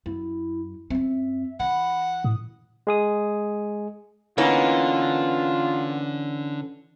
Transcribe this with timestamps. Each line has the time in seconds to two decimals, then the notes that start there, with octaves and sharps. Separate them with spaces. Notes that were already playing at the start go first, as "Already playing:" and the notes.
0.06 F#2 E4
0.90 F#2 C4 E5
1.60 E3 F#5 B5
2.24 A2 D#6
2.87 G#3 G#4 D#6
4.38 D3 E3 A#3 B3 C#4 D#4 F4